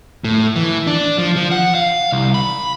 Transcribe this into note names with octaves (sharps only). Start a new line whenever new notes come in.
A2
E3
D4
F3
F3
F#5
F5
C2
B5